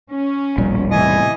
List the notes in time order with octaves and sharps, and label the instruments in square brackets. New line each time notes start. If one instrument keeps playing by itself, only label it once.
[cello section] C#4
[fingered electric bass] E1 G3 [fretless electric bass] A1 A#2 F3
[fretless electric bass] A2 C3 [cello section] E3 [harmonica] D#5 G#5